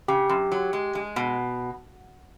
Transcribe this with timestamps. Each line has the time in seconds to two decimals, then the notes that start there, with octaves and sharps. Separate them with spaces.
0.08 C#3 G4
0.30 F#2
0.52 F#3
0.73 G#3
0.95 G#3
1.16 B2